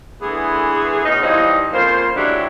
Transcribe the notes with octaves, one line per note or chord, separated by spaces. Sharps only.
D3 E3 A3 B3 G#4
B2 C#4 D#4
E3 F3 G3 C4 D#4
F2 C#3 A#3 F4 C5
D3 F#3 G#3 D4 E4 G4